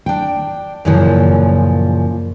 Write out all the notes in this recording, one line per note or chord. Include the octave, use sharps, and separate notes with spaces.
D4 G5
F#2 A#2 C#3 E3 F3